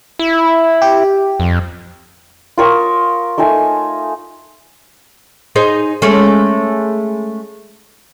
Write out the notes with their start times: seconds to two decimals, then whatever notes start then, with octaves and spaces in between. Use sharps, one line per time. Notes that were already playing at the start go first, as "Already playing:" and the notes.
0.19 E4
0.82 G4
1.40 F2
2.58 F4 A#4 C#6 D#6
3.38 A3 D#4 F4 G#5
5.56 D#4 G#4 C5
6.02 G#3 A3 C#4